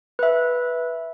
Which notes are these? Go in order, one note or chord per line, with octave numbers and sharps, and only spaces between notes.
B4 E5